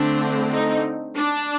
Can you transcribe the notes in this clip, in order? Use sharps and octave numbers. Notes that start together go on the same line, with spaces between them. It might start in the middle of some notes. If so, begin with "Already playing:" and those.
Already playing: D3 A3 C4 D4
D#4
D4